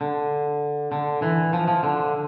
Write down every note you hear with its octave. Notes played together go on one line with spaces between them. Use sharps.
D3
D3
E3
F3
F3
D3